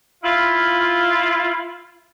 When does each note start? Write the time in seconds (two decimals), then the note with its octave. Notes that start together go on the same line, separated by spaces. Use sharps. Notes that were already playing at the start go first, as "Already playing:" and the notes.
0.23 E4 F4